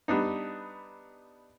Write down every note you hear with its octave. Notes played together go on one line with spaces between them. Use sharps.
G3 B3 D4 D#4